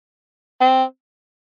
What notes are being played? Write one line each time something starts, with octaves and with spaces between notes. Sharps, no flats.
C4